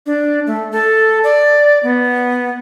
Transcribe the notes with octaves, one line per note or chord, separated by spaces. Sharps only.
D4
A3
A4
D5
B3